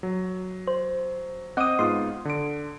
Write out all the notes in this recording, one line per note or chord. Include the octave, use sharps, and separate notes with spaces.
F#3
C5
C4 D#5 F#5 D6 D#6
G#2 B3 F4 C6 D#6
D3 D7